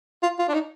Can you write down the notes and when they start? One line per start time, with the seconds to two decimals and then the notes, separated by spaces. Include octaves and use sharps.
0.23 F4
0.39 F4
0.48 D4
0.54 D#4